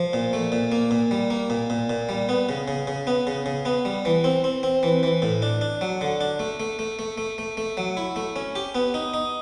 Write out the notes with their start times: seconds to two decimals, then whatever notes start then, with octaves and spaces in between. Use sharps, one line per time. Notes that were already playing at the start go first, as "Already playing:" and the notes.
Already playing: F3
0.13 A#2
0.33 A3
0.52 A#2
0.72 A#3
0.91 A#2
1.11 G3
1.30 A#3
1.50 A#2
1.70 A#2
1.90 A#2
2.09 G3
2.29 B3
2.49 C#3
2.68 C#3
2.87 C#3
3.07 B3
3.27 C#3
3.46 C#3
3.65 B3
3.85 G3
4.05 E3
4.24 C4
4.44 C4
4.63 C4
4.83 E3
5.03 E3
5.22 A2
5.42 D4
5.61 D4
5.81 F#3
6.01 D3
6.21 D4
6.40 A3
6.60 A3
6.79 A3
6.99 A3
7.18 A3
7.38 A3
7.57 A3
7.77 F#3
7.97 E4
8.16 A3
8.36 C#4
8.55 G4
8.75 B3
8.94 D#4
9.14 D#4